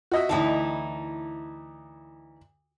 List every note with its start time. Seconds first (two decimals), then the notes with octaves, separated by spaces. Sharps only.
0.11 F#4 D#5 E5
0.29 D2 E3 D#4 E4 A5